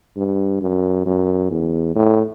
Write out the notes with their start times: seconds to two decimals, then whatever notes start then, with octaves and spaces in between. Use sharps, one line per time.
0.17 G2
0.61 F#2
1.06 F#2
1.51 E2
1.95 A2